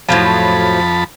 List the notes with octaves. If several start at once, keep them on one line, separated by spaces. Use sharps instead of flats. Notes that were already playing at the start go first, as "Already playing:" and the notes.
F2 A2 F3 F#3 A5 B5